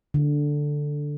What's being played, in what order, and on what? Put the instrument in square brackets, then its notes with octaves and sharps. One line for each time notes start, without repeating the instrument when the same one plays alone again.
[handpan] D3